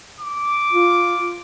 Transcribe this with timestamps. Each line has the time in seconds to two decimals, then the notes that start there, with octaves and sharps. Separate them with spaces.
0.21 D6
0.73 F4